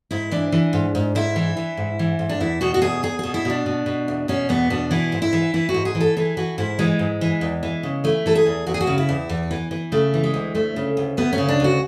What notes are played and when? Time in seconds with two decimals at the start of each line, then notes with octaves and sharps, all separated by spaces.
0.11 G#2 E4
0.31 E3 D4
0.52 E3
0.73 G#2
0.95 G#2
1.15 G#2 E4
1.36 E3
1.57 E3
1.77 G#2
1.99 E3
2.19 G#2
2.29 D4
2.40 E2 E4
2.61 B2 F#4
2.74 F#4
2.82 E2 G#4
3.03 E2 G#4
3.19 B2 G#4
3.34 E4
3.45 B2 D4
3.66 B2
3.86 B2
4.08 E2
4.28 B2 C#4
4.49 E2 B3
4.70 B2 D4
4.91 E3 E4
5.12 G#2
5.22 E4
5.33 E3
5.54 E3 E4
5.69 F#4
5.74 G#2
5.85 G#4
5.95 E3
6.00 A4
6.17 E3 G#4
6.37 E3 F#4
6.58 G#2 E4
6.79 E3 G#3
6.99 G#2
7.21 E3
7.41 E2
7.63 E3
7.83 C#3
8.04 E3 A3
8.26 E3 A4
8.35 G#4
8.46 E2
8.67 E2 F#4
8.74 G#4
8.81 F#4
8.87 C#3
8.98 E4
9.09 E2
9.29 E2
9.51 E3
9.71 E3
9.92 C#3 A3
10.14 E3
10.24 G#3
10.34 D2
10.55 D2 A3
10.76 C#3
10.97 D2
11.17 D2 B3
11.33 C#4
11.38 C#3
11.49 D4
11.60 D2 F#4